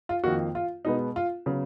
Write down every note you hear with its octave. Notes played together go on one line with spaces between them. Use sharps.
F4
F2 D#3 A#3 F#4
F4
B2 G#3 B3 D#4
F4
C#3 F#3 B3